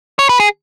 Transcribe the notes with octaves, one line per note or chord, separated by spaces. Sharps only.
C#5
B4
G#4